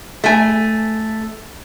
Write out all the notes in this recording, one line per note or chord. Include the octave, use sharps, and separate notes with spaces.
A3 G#5